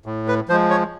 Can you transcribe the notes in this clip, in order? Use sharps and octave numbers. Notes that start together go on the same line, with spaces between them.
A2
B4
F3 G#3 C5
C#5